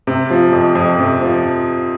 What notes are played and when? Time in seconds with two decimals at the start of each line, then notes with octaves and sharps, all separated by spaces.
0.07 C3
0.30 F3
0.53 F2
0.75 F2
0.99 C3
1.22 F3